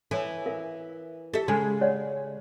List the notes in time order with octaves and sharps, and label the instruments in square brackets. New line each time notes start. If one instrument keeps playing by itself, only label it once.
[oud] E3 [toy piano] A4 C#5 G#5
[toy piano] A#4 E5 F5
[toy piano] G4 [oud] A4 E5
[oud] C#3 G#3 G#4
[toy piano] C#5 D5 F#5